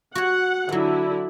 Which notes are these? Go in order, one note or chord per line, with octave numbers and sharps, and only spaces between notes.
F#4 C#5 F#5
D3 F#3 E4 F#5